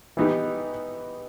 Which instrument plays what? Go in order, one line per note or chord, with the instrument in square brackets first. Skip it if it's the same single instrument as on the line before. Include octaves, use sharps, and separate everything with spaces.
[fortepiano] E3 B3 D#4 G4